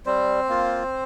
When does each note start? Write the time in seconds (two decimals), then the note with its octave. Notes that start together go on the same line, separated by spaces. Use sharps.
0.06 G3 C4 C5
0.49 A#3 F4